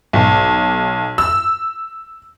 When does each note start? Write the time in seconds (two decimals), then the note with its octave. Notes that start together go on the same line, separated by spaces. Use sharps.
0.13 B1
1.18 E6